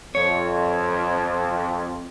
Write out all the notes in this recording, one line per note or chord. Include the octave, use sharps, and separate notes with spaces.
F2 C#5